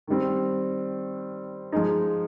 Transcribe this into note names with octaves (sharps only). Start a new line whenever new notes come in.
D#3 G3 C4
F3 G#3 D#4